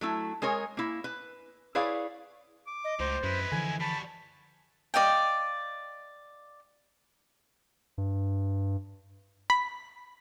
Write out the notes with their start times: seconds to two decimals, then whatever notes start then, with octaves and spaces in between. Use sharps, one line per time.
0.01 F#3 A3 E4
0.42 G#3 G#4 A#4 C#5
0.77 A#3 E4
1.04 B4
1.75 E4 G#4 B4 C#5 D5 F5
2.67 D6
2.84 D#5
2.99 C#2 A2 D#4 C5
3.23 F#2 G#3 E4 B4
3.52 D3 E3 F3 G#5
3.80 G3 F#4 A5 B5
4.94 D5 D#5 F5 G5
7.98 G2
9.50 B5